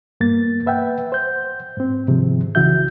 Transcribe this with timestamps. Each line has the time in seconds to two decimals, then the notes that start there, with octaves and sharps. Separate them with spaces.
0.21 G2 A#3 B3 A6
0.66 B4 E5 F#5 G5
1.12 C5 G6
1.77 G#2 C4
2.08 G#2 C3 D#3 F3 G#3
2.55 C2 C#3 E3 F#4 E5 G6